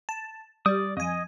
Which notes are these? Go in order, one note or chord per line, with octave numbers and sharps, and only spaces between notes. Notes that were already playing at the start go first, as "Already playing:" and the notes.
A5
G3 D5 D#6
F2 D#5 G#5